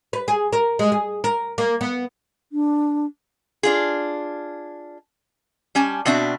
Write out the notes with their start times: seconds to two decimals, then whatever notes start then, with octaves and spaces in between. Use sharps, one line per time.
0.13 B4
0.28 G#4
0.53 A#4
0.79 G#3
0.92 G#4
1.24 A#4
1.58 A#3
1.81 B3
2.52 D4
3.63 D4 F4 G#4
5.75 G3 C#4 G#5 A5
6.06 B2 C4 D4 F#4 E5